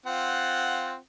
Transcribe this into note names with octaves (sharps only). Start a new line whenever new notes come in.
C4 F4 F#5